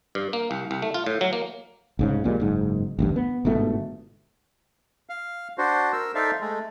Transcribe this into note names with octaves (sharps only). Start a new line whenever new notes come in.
G2
A#3
C2
C2
A3
F4
A2
F#3
A#3
C2 G#2 C#3
A#1 A#2 G3 G#3
F#1 G#2
A1 D2 G2
B3
G1 G#2 B2 A3
F5
D4 F#4 C5
A#4 E6
D#4 A4 C5 D5 E5 F5
G#3 A3